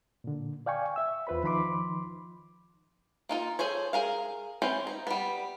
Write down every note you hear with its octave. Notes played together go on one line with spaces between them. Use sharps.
A#2 D3
D5 F5 G5 G#5 C#6
E5 E6
E2 F4 B4 C5 B5
D#3 F3 D#4 B5 C6 D6
A#3 D#4 F4
G#4 A4 C5 C#5
G#4 A#4 F5
E3 C4 C#4 C5
D#4
G3 B3